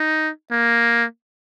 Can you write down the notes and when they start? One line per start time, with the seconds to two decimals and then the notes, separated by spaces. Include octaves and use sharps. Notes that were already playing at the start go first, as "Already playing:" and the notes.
Already playing: D#4
0.51 A#3